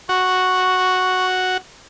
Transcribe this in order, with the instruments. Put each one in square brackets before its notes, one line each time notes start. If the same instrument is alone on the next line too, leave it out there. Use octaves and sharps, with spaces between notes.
[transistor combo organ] F#4 [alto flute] C#6